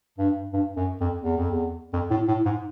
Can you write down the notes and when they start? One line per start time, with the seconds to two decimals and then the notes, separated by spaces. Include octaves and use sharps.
0.18 G2
0.53 G2
0.77 F#2
1.00 F2
1.23 E2
1.37 F2
1.51 E2
1.93 F2
2.10 A2
2.28 A2
2.45 G#2